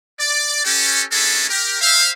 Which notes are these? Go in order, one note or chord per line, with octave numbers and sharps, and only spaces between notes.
D5
C#4 G4 A4
A3 C#4 D4 E4 G#4 A4
G4 A#4
C5 E5 F5